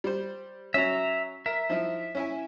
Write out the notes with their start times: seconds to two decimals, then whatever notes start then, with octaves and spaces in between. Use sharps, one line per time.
0.04 G3 C5
0.74 F#3 C#4 E5 A#5
1.46 A#4 E5
1.69 F3 D#4 E4
2.15 C#4 E4 G#5